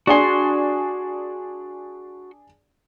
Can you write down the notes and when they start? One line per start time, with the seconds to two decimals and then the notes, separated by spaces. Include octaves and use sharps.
0.07 D4 F#4 G#4 G#5 C6